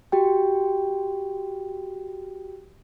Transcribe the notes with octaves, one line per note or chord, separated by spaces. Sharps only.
F#4 G4 G5